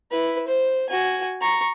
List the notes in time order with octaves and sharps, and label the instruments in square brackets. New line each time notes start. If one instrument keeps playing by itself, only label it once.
[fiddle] E4 B4
C5
F#4 G#5
A#5 C#6